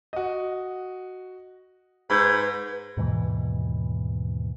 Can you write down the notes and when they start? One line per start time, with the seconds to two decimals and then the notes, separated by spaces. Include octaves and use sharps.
0.13 F#4 D#5
2.10 G#2 B4 B5 G6
2.97 D#2 G#2 B2 E3